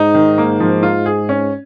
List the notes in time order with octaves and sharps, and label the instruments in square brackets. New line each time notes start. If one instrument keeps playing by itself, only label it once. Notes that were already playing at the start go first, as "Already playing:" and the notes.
Already playing: [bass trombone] G#2 [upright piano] D#4
[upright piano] D#3
A#3
F3
F4
G#4
C#4